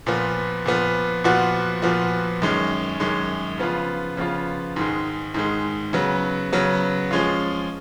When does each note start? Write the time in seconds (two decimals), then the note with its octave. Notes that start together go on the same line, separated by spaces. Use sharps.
0.07 A#2 F3 B3
0.66 A#2 F3 B3
1.24 A#2 F3 B3 F#4
1.82 A#2 F3 B3 F#4
2.42 F#2 D#3 G#3 C#4
3.00 F#2 D#3 G#3 C#4
3.58 C#3 F3 B3 F4
4.17 C#3 F3 B3 F4
4.76 G#2 D#3 G#3
5.34 G#2 D#3 G#3
5.93 C#3 F#3 B3
6.53 C#3 F#3 B3
7.11 F3 G#3 C#4 F4